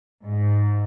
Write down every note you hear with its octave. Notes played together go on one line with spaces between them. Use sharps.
G#2